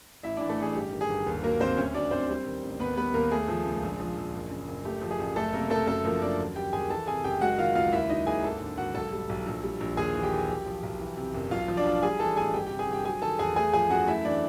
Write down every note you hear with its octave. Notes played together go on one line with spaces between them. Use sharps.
A1 E4 E5
E3 D4 D5
A3 A4
A1 G#4
G1 G4
D#3
G#4
G1
D#2
F#3 A#3 A#4
D#2 C4 C5
D2 C#4 C#5
F#3 D4 D5
D2 C4 C5
G3
D#3
A1
D#2 B3 B4
G3 B3 B4
D#2 A#3 A#4
A3 G#4
F3
C#2
A#1
F3
A#1
F#1
C#3
F#1
A3 G4
F3
G#4
A1
F#1 A3 A4
C3 A#3 A#4
F#1 A3 A4
F#2 A3 A4
F3 A#3 A#4
F#2 D4 D5
D#2
G3 G4 G5
D#2 G#4 G#5
E3 A4 A5
C3 G#4 G#5
F#1 G4 G5
G#3 F#4 F#5
D#3 F4 F5
C#2 F4 F5
D#2 E4 E5
F#3 D#4 D#5
D#2 G#4 G#5
G#1 A4 A5
D3
G#1 F#4 F#5
B1 A4 A5
G3
B1
A#1
G3
A#1
D#2 G#4 G#5
E3
G4 G5
D#2
B1
F3
B1
E3
C3
F#1
B1 F4 F5
F3
D4 D5
B1
G3 G#4 G#5
E3 A4 A5
A1 G#4 G#5
G1 G4 G5
C3 G4 G5
G#4 G#5
G1 G4 G5
F#3 G#4 G#5
D#3 A4 A5
E2 G#4 G#5
A3 G#4 G#5
F3 G#4 G#5
F#2 F#4 F#5
A3 E4 E5
E3 D4 D5